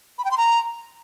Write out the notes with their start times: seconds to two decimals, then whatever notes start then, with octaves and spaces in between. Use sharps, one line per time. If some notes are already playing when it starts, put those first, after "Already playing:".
0.18 B5
0.25 G5
0.31 C6
0.38 A#5